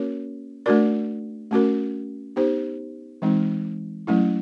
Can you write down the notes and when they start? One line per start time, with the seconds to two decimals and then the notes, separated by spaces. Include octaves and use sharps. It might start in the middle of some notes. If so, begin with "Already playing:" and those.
Already playing: A#3 C#4 F#4 A#4 C#5
0.66 A3 D4 F#4 A#4 D5
1.51 A3 C#4 F#4 A#4
2.36 B3 D#4 G4 C5
3.22 E3 G#3 C4 D#4
4.07 F#3 A3 C#4 E4